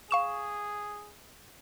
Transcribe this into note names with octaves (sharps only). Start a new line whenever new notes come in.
G#4 F5 C#6 E7